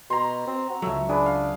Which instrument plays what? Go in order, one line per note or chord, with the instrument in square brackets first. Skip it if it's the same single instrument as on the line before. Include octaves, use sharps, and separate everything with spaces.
[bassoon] B2 [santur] A#5 C6
[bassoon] C4
F#4
[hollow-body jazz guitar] C#2 F#3 [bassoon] A3 [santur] E5
[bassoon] D4 [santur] G#4 B4
[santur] F5